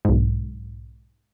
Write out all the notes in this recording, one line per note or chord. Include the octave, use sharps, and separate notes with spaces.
B1 G#2